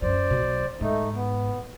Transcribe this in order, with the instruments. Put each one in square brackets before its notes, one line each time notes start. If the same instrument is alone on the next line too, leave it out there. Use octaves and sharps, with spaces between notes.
[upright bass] F#2 F3 [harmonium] C5 D5
[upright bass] B1 B2
[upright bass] G#2 [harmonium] A3 D#4
[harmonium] B3